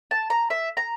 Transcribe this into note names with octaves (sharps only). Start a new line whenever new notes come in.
A5
A#5
E5
A#5